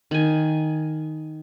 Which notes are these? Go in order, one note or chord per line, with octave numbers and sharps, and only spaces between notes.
D#3 G#5